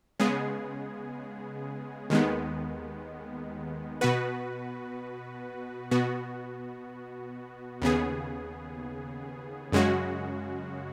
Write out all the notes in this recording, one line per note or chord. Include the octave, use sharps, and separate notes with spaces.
C#3 G#3 B3 G#4
D#2 D#3 G#3 B3
B2 B3 F#4 B4
B2 B3 F#4
D#2 C#3 B3 G#4
F#2 C#3 G#3 C#4 F#4